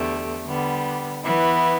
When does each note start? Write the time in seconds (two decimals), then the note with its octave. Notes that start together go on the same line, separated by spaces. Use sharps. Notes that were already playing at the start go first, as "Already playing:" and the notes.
Already playing: E2 D3 A3 G4
0.45 D3 G3 B3
1.24 E3 B3 E4